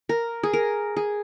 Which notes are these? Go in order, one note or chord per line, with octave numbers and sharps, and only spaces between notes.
A#4
G#4
A#4
G#4